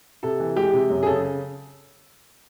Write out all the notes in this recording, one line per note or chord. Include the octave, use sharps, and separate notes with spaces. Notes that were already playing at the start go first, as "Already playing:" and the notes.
C3 A4
E3
G#3 G4
C3
F#2
G#4
C#3 A4